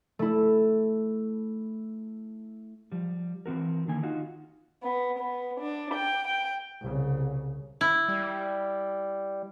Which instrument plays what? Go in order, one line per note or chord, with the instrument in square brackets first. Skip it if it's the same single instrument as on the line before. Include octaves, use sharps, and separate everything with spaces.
[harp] A3 E4
[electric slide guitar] F3 G3
E3 C4 F#4 A#4
D3 D#3 A#3 G#5
D#4 F4 F#4
[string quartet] B3
B3
D4
G5
G5
[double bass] C2 C#3
[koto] E4
[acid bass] G3